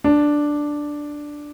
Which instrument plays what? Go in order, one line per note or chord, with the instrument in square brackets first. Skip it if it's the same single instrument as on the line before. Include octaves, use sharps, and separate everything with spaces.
[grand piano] D4